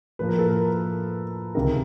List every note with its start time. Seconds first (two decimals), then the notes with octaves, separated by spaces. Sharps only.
0.19 A2 F3 A#3 B4
0.29 A#4
0.38 A4
0.48 A#4
1.55 C#2 C3 D#3 A#4